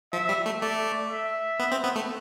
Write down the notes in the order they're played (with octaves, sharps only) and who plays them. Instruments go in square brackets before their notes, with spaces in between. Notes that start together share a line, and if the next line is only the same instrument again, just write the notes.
[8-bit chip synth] F3 [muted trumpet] E5
[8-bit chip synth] G3
A3
[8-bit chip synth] A3 [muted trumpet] D5
[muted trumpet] E5
[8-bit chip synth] B3
C4
B3
A3